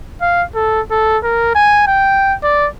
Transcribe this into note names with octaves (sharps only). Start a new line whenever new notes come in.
F5
A4
A4
A#4
G#5
G5
D5